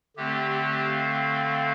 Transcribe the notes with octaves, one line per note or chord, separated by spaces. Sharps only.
D3 A3 C4 G4
G4
F5